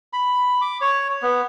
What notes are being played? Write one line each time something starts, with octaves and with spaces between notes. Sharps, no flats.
B5
D6
C#5
B3